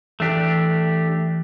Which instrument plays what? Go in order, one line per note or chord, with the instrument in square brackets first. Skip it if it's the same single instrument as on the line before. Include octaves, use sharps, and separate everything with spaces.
[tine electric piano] E3 [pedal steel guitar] A3 D4 G4